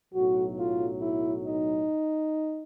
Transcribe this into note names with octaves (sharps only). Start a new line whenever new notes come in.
B1 A2 F#3 F#4
F4
E4
D#4